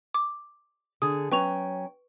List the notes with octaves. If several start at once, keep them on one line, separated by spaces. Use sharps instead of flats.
D6
D3 G#4 D#6
F#3 C#4 B4 G5 C#6 F7